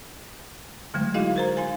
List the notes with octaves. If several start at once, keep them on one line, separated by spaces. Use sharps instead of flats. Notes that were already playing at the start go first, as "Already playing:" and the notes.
D3 F#3 G#3 A3
D#4 E4 F#4 G#4 D#5 F5
A#4 C5 A#5
D#4 F5 G#5